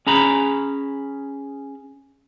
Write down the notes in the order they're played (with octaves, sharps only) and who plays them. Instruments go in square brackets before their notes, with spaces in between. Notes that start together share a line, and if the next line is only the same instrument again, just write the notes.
[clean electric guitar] C#4 G#4 A#5 B5